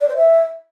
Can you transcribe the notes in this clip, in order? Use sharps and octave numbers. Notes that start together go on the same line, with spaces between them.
D5
C5
E5